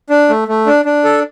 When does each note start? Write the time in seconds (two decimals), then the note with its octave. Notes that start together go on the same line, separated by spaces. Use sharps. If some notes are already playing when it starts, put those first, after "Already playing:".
0.10 D4
0.29 A3
0.48 A3
0.67 D4
0.85 D4
1.04 A4